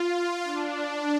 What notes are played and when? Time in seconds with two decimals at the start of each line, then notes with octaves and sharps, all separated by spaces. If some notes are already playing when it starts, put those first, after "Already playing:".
Already playing: F4
0.44 D4